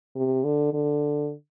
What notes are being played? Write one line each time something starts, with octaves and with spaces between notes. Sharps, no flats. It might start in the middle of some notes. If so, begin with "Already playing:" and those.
C3
D3
D3